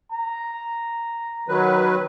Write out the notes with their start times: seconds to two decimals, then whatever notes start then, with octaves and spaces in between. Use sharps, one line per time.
0.12 A#5
1.48 D#3 F#3 B4